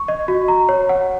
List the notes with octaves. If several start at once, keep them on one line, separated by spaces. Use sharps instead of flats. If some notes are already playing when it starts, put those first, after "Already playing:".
Already playing: C#6
D#5
F#4
A#5
C#5
F#5